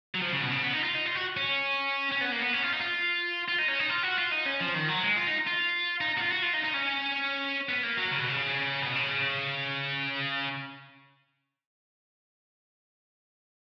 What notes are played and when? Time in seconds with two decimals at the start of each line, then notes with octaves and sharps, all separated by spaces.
0.14 F#3
0.21 F3
0.32 C#3
0.42 B2
0.52 C#3
0.63 B3
0.73 D#4
0.84 F4
0.95 D#4
1.06 F4
1.15 F#4
1.37 C#4
2.12 C#4
2.21 B3
2.32 A#3
2.42 B3
2.53 C#4
2.63 F4
2.72 D#4
2.80 F4
3.48 F4
3.58 D#4
3.68 C#4
3.79 D#4
3.90 F4
4.03 F#4
4.18 F4
4.32 D#4
4.46 C#4
4.60 F3
4.74 D#3
4.88 F#3
5.03 G#3
5.16 F4
5.27 D#4
5.47 F4
6.01 D#4
6.17 F#4
6.21 F4
6.31 F#4
6.42 F4
6.53 D#4
6.64 D#4
6.74 C#4
7.69 B3
7.83 A#3
7.97 F#3
8.12 C#3
8.20 B2
8.29 C#3
8.82 B2
8.95 C#3